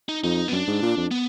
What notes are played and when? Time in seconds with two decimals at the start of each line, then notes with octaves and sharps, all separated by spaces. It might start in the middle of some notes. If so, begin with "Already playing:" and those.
0.09 D#4
0.24 F2 D#4
0.48 B3
0.52 F#2 D4
0.67 G#2
0.82 A#2
0.97 F2
1.11 B3